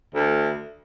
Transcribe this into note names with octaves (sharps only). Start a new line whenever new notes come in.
D2